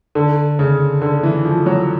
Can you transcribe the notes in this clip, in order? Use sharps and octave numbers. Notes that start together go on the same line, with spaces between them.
D3
C#3
D3
E3
F3
F#3